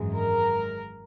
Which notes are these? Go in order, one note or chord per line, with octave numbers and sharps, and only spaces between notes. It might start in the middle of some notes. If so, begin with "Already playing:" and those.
Already playing: G#1 F#2 E3 G#3
A#4